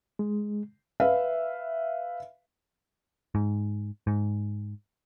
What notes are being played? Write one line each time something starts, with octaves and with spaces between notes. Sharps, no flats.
G#3
B4 E5 F5
G#2
G#2